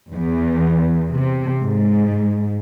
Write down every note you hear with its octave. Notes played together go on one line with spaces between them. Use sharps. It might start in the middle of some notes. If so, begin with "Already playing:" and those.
E2
C3
G#2